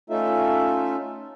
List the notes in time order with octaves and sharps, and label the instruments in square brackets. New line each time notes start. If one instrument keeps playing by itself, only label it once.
[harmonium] A3 C#4 D#4 F4 A4 E5